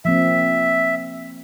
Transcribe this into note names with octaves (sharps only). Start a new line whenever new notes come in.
F3 A#3 C4 E5